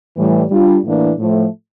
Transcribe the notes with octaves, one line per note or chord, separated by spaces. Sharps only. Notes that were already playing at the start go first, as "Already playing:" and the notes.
A2 E3 G3
G3 D4 F4
A2 E3 A#3 D4
A2 F3 A3